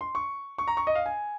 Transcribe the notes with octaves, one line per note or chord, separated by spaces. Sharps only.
C6
C#6
C#6
A#5
C#6
D#5
F5
G#5